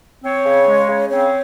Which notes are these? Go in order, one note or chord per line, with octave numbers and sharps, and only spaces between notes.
C4 C#5
C#3
G#3
C#3
C4 C#5